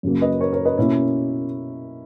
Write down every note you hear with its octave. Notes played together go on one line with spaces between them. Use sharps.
F#2 C#3 F#3 A#3
B4 D#5
A#4 C#5
A#4 C#5
B4 D#5
B2 A#3 C#4 E4